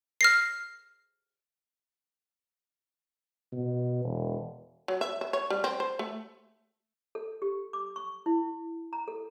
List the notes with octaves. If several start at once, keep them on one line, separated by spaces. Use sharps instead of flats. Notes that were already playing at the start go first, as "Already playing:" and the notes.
F6 A#6 C7
B2
E1
F#3
E5
E5
C#5
G3
C4
C5
A3
A4
G4
D6
C#6
E4
A#5
A4